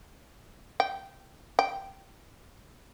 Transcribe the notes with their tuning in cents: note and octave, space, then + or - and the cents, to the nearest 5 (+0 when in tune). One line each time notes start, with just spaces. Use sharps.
G5 -15
G5 -15